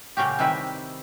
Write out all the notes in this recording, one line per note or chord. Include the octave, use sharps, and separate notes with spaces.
A#2 C#3 C#4 F#4 G4
C3 D#3 G3 E4 B4 E5